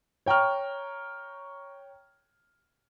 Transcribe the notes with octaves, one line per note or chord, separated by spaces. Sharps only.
C#5 G5 A#5 C#6 F6